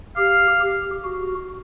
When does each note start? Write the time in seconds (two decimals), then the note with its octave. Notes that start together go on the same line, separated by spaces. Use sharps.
0.17 G4 F5
0.60 G4
1.04 F#4